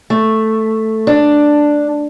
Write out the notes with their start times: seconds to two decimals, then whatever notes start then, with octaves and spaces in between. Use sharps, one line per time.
0.10 A3
1.07 D4